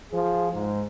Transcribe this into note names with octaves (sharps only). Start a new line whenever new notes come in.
F3 G#4
G#2